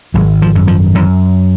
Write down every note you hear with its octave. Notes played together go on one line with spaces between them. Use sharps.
G#1 F#3
F3
F#2
F3
F#2 E3